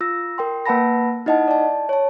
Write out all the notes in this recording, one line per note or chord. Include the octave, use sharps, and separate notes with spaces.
F4 E6 A#6
A#4 G5 C6
A#3 B4 F#5 A5 B5 A#6
D#4 E4 D#5 F#5 A5
D5 A5
C#5 A5